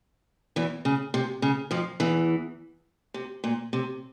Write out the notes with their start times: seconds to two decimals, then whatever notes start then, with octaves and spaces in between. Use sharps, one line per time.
0.56 E2 E3
0.85 C#3
1.14 C3
1.42 C#3
1.71 F2 F3
2.00 E2 E3
3.14 C3
3.44 A#2
3.73 C3